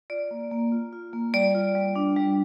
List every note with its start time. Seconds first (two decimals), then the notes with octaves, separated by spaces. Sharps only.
0.10 F4 D5
0.31 A#3
0.51 A#3
0.72 F4
0.93 F4
1.13 A#3
1.34 G3 D5
1.55 F4
1.75 G3
1.96 D4
2.16 G3